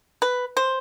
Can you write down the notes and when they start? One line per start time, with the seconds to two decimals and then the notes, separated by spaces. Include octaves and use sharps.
0.22 B4
0.57 C5